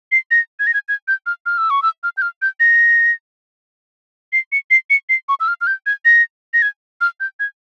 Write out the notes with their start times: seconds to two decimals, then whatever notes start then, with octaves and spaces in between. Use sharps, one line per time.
0.12 C7
0.31 A#6
0.60 G#6
0.67 A#6
0.74 G#6
0.89 G#6
1.08 G6
1.26 F6
1.46 F6
1.58 E6
1.70 C#6
1.82 E6
2.03 F6
2.17 G6
2.22 F6
2.42 G6
2.60 A#6
4.33 C7
4.52 C#7
4.71 C7
4.90 C#7
5.09 C7
5.29 C#6
5.40 E6
5.48 F6
5.61 F6
5.67 G6
5.86 G#6
6.05 A#6
6.54 A#6
6.62 G#6
7.01 F6
7.20 G6
7.40 G#6